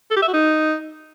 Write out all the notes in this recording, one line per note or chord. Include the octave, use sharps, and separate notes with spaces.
A4
G4
E5
F#4
D#4